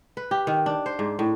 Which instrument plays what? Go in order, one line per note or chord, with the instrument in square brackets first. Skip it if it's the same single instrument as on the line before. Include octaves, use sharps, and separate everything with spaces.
[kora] B4
G4
D#3
D4
C5
G#2
A2